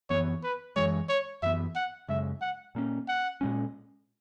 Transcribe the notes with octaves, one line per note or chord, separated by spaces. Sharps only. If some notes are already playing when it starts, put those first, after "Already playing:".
F#2 E3 B3 C#5
B4
F#2 E3 G#3 C#5
C#5
F#2 E3 B3 E5
F#5
F#2 C#3 G#3 E5
F#5
A#2 A#3 C#4
F#5
A#2 G#3 C#4